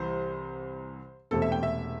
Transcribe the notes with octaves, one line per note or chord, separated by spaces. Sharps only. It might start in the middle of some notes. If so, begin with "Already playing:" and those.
Already playing: C2 C3 E3 C5
E1 E2 C3 A3 C4 A4
E5
G5
E5